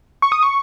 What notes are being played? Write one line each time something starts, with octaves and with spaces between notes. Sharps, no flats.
C#6
D#6
C#6